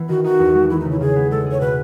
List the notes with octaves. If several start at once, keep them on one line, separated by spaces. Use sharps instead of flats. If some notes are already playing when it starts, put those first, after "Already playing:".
Already playing: E3 B3
D#3 F#4
D#4 F#4
E2
G#3
E3 E4
D#4
C#3
E4
C#3 G#4
B3
G#3 A4
G#4 C#5
B2 B4